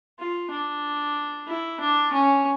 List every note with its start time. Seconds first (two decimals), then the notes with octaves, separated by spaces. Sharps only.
0.19 F4
0.50 D4
1.47 E4
1.80 D4
2.13 C#4